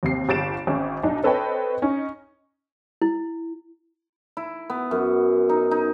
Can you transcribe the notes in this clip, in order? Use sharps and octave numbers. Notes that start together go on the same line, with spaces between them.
D#2 C3 C7
G1 G4 A6 D7 E7
G#1 C#4
B1 D4 D#4 D#5
C4 A4 B4 C#5 D#5 G5
C#4 D#4
E4
E4
B3
F#2
D#4
D#4